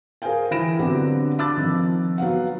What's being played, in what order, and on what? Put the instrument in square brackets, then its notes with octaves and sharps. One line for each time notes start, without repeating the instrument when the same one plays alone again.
[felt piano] G#4 A#4 C5 F5 G5 G#5
E3 E4 B5 A#6 D7 E7
D3 F#3 B3 C4 D4 G4
A5 B5 D6 E6 F#6 A6
D#3 F3 C4
F#3 B3 F5 F#5